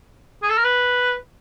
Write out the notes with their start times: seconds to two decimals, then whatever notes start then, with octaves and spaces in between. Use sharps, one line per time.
0.42 G#4
0.49 A4
0.57 A#4
0.64 B4